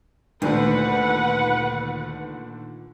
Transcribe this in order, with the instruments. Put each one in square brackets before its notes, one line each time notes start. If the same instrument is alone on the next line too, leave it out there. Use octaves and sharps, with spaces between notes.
[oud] D2 [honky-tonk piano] A#2 D3 D#3 [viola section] B4 F#5